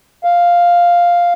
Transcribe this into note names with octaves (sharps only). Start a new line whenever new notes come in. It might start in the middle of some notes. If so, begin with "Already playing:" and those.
F5